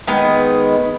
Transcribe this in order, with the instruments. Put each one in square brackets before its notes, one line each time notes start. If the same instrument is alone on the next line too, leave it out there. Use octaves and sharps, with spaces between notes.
[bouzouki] D#3 G#3 B3